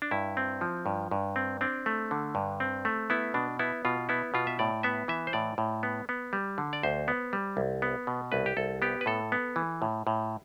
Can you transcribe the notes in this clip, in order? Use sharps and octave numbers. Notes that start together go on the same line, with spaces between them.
D4
G2 E4
C4
F3
G2
G2
C4
C4 D4
A3
D3
G2
C4
A3
B3 E4
B2 D4
B3 E4
B2 F4
B3 E4
B2 F4
E5
A2 D5
B3 E5
E3 E5
C5
A2 D5
A2
B3
B3
G3
D3
D5
D2 C5
B3
G3
C2
B3
B2
C2 B4
G4
C2 A4
B3 G4
B4
A2 A4
B3
E3
A2
A2